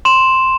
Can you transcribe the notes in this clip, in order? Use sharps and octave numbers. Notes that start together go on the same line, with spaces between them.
C6 E7